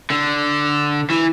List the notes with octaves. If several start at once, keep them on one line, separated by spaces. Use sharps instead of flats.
D3
E3